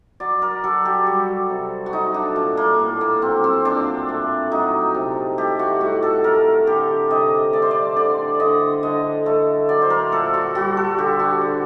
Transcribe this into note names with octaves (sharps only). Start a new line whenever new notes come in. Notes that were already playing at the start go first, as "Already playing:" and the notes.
F#3 D5
A#4
F#3 A4
G4
G3 F#4
C3
F#4
A3 D#4
D4
A#2
A#3
A2
A#3
F#3 C4
C4
A#2 D4
A3
F#3 D#4
C3
A3 G4
F#4
A2 F#4
A4
A3 A#4
D3 G4
C3 D#5
A3 D5
C5
D5
D3 D5
D3 D#5
D3 D#5
A3
F#3 D5
C5
A#4
A#2 A4
F#4
G3 F#4
A4
D3 G4
F#4
D3